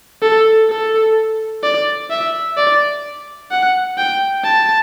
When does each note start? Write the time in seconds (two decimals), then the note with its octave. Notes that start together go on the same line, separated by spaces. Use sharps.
0.22 A4
0.70 A4
1.63 D5
2.10 E5
2.57 D5
3.51 F#5
3.98 G5
4.44 A5